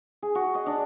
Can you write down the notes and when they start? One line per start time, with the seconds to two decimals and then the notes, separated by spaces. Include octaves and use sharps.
0.22 G#4
0.35 F#4
0.55 D#5
0.66 D4